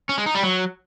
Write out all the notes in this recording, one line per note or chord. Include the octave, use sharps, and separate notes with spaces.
C#4
G#3
D#4
G3
F#3